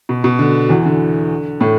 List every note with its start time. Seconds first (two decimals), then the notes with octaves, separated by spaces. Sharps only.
0.09 B2
0.24 B2
0.39 D3
0.69 E2 E3
0.86 D3
1.61 A2 A3